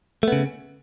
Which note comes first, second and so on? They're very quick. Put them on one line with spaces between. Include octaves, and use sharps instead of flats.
A3 B3 C#3